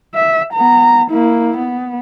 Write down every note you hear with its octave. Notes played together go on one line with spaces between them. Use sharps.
E5
B3 A#5
A#3 E4
B3